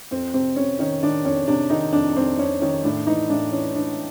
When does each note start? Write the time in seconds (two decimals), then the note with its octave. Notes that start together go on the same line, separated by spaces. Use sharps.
0.11 F2 C4
0.34 C3 C4
0.56 C3 C#4
0.79 D#3 C#4
1.03 D#3 D4
1.25 F2 C#4
1.47 C3 D4
1.70 D#3 D#4
1.93 F2 D4
2.17 F2 C4
2.38 F2 C#4
2.61 D#3 C#4
2.84 A2 D4
3.07 E3 D#4
3.29 A2 D4
3.52 E3 C#4
3.75 E3 D4